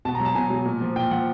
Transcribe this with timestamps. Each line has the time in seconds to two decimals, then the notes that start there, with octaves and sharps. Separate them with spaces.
0.05 B2 A5
0.15 A#5
0.20 F#3 A5
0.35 B2 G#5
0.50 F#3
0.65 A#2
0.81 F3
0.96 A#2 G5
1.11 F3 F#5